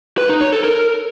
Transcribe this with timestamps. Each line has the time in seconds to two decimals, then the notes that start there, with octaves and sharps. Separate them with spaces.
0.18 B4
0.29 D#4
0.41 C#5
0.53 A4
0.64 A#4